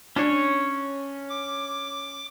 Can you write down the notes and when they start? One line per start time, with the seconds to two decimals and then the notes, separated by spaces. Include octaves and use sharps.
0.16 C#4 D4 C#5
1.29 D6